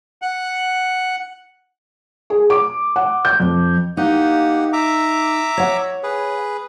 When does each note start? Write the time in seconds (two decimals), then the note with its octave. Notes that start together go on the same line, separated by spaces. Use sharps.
0.22 F#5
2.30 G#4
2.50 D6
2.96 F#5
3.25 G6
3.40 F2
3.97 A#3 D#4 G4 F#5
4.73 E5 A#5 D6
5.57 C#5 F#5
6.03 G#4 B4